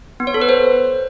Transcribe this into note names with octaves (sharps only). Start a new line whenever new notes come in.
B3
C#5
A4
B4
C5